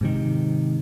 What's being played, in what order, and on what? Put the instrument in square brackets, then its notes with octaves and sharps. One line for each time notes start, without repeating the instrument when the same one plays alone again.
[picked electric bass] G#2 C3 D#3